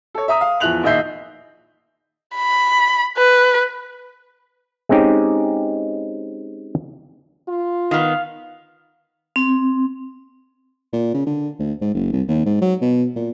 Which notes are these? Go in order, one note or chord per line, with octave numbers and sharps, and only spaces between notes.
A4 C#5
E5 A#5 D#6
F5
E2 F3 E4 F#6 F7 F#7
A#1 D#3 D#5 E5 G6 C7
B5
B4
G#3 C4 C#4 D#4 G4
F4
D#3 B3 F5
C4
A#2
C#3
D3
D2
G#2
F#1
C2
D#2
G#2
F#3
B2
A#2